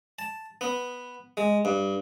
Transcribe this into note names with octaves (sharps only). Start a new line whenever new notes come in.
A5
B3
G#3
G2